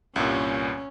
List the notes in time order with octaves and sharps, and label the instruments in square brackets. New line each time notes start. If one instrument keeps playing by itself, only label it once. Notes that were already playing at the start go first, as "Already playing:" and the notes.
[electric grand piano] C2 G2 A#2 [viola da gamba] C#4